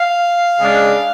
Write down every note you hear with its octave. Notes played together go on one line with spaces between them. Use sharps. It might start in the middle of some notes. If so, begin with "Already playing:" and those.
Already playing: F5
C#3 G#3 D4